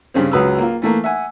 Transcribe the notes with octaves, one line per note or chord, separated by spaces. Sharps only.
G2 C#3 C4
C#2 F#3 B4 D#6 E6
A#3 F4
E3 A3 A#3
E5 F#5 G#5